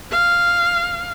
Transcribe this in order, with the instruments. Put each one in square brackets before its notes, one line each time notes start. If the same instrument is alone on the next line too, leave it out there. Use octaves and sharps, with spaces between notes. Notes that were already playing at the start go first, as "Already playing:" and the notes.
[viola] F5